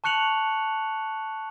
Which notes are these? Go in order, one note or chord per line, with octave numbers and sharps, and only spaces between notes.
A5 C#6 F#6 C#7 F7 F#7